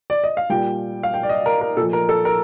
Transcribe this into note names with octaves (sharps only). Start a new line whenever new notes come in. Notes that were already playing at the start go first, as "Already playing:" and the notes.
D5
D#5
F5
A#2 G3 G5
F5
G5
D5
D#5
A#4
A#4
A#2 A4
F3
A#4
A4
A#4